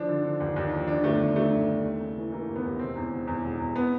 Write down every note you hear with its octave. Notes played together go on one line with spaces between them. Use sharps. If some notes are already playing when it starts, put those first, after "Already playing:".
Already playing: F3 D4
D3
D3
D#2
D#2
F3
D3 D4
G1 A3
G1
G2 A3
G1
G2
D#2
C#3
E3
E3 A#3
D#2
B3
D#2
E1 C4
E2
E1
E2
E1
E2
B3